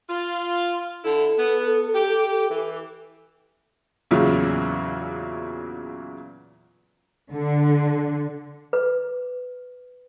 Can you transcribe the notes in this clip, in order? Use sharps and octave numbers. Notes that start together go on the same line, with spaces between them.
F4
D3 E4 A4
B3
G4
E3
E2 A#2 C#3 E3 F#3
D3
B4